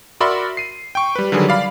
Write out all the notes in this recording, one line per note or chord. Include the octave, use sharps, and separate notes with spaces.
F#4 A#4 D5 E5 B5 C6
C7 D#7
G5 C#6
G3 B4
D3 D#3 F#3 G3 G#4 B4
D5 F5 B5